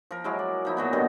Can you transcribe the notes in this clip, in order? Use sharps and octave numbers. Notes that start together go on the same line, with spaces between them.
F3 A#4
F#3 G#3 E4
D5
F3 D#4 E4
A#2 F#3 B3
G2 B2 D3 D#3